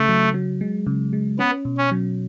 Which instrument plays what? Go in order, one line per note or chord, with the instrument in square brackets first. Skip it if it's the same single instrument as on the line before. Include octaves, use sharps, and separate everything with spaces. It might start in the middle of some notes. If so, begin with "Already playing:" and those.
Already playing: [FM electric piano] C#3 [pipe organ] A3
[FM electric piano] F#3
F#3
G#3
C#3
G#3
[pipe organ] B3 [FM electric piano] C#4
[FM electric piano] B2
[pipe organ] C#4
[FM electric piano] F#3